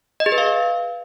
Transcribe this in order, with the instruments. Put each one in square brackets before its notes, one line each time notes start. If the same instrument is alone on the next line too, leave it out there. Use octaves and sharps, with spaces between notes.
[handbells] D#5
G#4
B4
F5